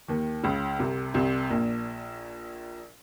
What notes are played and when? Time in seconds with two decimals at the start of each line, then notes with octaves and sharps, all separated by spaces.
0.08 D#2 D#3
0.43 C#2 C#3
0.79 C2 C3
1.14 C2 C3
1.50 A#1 A#2